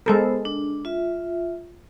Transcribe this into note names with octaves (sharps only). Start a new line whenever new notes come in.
G#3 B3 A4 A#4 C5
D4
F4 E5